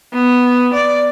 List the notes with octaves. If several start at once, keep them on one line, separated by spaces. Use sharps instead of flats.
B3
D5